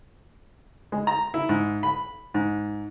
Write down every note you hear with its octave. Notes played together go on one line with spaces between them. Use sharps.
G#3
A#5
E4
G#2
B5
G#2